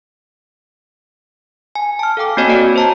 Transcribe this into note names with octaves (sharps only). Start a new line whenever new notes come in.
G#5
A5 F6
A4 F5 G5 D6
A#3 C4 F#4 C#5 D#5 G#5
F#4 D5 D#5 D7
C5 A5 A#5